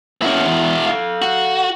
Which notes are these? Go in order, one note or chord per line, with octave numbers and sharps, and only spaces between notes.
A#3 C#4 E4 F#4
E2
A4 F5
F#4